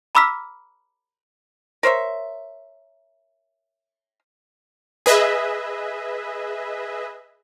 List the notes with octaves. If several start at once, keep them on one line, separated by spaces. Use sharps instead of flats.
A#5 B5 D6 E6 F6 B6
A#4 C5 C#5 E5
G#4 B4 D#5 E5